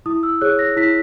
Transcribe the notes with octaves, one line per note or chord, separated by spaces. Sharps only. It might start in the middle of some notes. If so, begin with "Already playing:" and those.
E4 D#6
E6
G#4 C#5 F#6
A#6
E4 B6